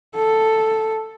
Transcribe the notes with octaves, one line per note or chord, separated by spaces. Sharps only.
A4